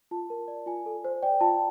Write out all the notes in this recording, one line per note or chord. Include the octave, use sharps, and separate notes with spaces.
F4 A5
A#4
D5
F4 G#5
A4
C5
D5 G5
F4 A5